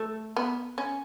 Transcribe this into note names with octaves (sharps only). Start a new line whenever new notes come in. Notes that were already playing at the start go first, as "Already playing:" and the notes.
Already playing: A3
B3
C#4